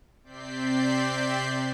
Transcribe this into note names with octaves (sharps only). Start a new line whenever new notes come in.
C3 C4 D5 G6 B6 C7